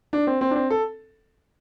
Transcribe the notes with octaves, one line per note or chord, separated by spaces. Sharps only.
D4
C4
C4
D4
C4
A4